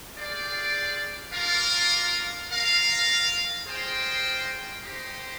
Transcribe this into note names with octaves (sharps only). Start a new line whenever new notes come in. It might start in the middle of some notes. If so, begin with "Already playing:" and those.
F4 G#4 D5 G5
D4 F4 A#4 D5 F5
F4 A#4 F5
F4 G#4 C5 D#5 G5
D#4 G4 C5